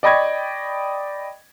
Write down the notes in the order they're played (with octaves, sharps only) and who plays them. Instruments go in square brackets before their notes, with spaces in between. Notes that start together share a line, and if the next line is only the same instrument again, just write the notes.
[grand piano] D5 D#5 G5 B5 C#6 G#6